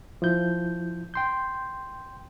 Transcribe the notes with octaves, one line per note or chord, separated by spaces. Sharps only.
F3 E4 G6
G5 C6 G6